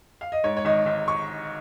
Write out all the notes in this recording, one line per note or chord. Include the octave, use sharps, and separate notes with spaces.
F5
D#5
G#2 C#5
C#5
G#1 D#5
G#1
C#6